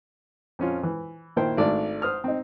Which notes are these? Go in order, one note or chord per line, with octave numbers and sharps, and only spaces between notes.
F2 C#4 F4
E3
A#2 D#3 E4 C5 G5
G#1 A3 D4 D5
C5 D#6 F6
C4 D#4